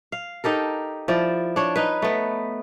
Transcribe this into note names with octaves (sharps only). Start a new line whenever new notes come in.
F5
D#4 G4 A4 A#4
F3 E4 D5
D4 C#5
D#4 B4
A3 B3